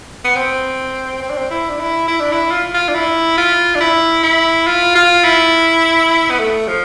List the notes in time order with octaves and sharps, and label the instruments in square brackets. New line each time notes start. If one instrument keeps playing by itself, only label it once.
[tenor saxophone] B3
C4
C4
D4
C4
E4
D4
E4
E4
D4
E4
F4
F4
D4
E4
F4
D4
E4
E4
F4
F4
E4
B3
A3
F3